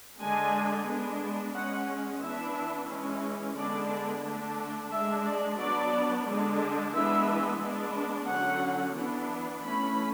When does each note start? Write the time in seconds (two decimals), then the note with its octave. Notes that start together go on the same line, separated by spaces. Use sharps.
0.20 D3 G#3 D4 G#5
0.87 G#3 B3 D4
1.54 G#3 C#4 F#5
2.21 E3 B3 D4 E5
2.89 E3 G#3 C#4
3.56 D3 G#3 B3 D4 D5
4.24 D3 A3 D4
4.91 G#3 D4 E5
5.25 D5
5.58 F#3 B3 D4 D5
6.27 D3 G#3 D4
6.94 E3 G#3 B3 D4 E5
7.60 G#3 B3 D4
8.27 D3 F#3 C#4 F#5
8.95 E3 B3 D4
9.62 E3 A3 C#4 B5